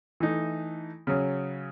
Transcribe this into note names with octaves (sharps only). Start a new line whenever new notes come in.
E3 A3 D#4
C#3 F#3 C#4